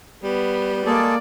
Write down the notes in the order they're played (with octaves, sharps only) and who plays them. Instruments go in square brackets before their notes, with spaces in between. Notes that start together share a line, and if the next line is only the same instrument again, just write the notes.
[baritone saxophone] G3 [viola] B3
[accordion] G#3 G#4 A4 [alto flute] A#3 [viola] D5